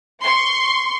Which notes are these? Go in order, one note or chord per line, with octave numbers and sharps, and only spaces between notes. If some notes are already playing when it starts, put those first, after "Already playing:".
C6 C#6